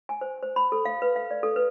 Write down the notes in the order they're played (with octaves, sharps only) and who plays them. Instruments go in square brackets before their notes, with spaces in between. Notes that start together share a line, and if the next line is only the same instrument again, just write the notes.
[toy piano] G#5
C5
C5
B5
A4
F5
B4
F5
D5
A4
B4